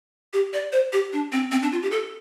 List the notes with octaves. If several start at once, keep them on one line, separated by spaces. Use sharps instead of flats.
G4
D5
C5
G4
D4
C4
C4
D4
F4
G4
A4